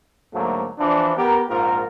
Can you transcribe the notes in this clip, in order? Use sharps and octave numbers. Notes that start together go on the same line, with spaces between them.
D2 G#2 F#3 A3 A#3
E3 F3 D4
B3 G4 A#4
A#1 G#2 F4 A#4